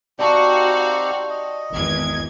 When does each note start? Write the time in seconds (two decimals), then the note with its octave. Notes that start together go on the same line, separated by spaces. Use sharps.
0.19 C4 D#4 F#4 G4 D5 F5 A5 C#6
1.30 D#5
1.71 G#1 E2 G#6